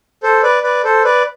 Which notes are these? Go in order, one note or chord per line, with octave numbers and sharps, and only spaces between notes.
A4 C5
B4 D5
B4 D5
A4 C5
B4 D5